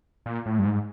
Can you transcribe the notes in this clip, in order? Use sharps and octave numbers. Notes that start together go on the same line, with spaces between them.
A#2
A2
G2
G#2